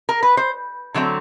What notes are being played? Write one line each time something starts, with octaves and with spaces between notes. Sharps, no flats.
A#4
B4
C5
D3 F#3 A3 C4